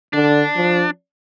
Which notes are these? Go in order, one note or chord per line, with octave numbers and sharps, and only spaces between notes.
D3 D4
F3